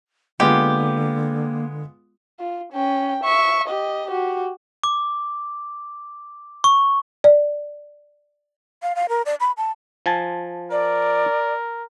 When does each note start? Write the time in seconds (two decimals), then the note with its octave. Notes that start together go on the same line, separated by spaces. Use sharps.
0.40 D3 G#3 A#3 B3 F4 G4
2.39 F4
2.73 C#4 G5
3.24 E5 C#6
3.68 G4 D#5
4.07 F#4 G4
4.84 D6
6.64 C#6
7.24 D5
8.83 F5
8.96 F5
9.09 A#4
9.26 D5
9.40 B5
9.57 A5
10.06 F3 G#5 A5
10.71 A#4 D5